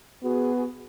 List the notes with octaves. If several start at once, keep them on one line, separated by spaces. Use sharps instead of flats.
B3 F#4 G#4